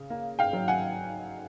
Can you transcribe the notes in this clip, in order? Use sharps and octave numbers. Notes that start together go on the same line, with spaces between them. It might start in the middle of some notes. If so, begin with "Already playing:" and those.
Already playing: C#3
A#3
F5 G5
F#3
F#5 G#5